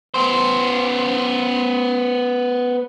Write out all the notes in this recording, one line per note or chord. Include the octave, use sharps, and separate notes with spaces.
B3 C5